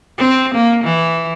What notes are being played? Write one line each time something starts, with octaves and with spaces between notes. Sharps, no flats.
C4
A#3
E3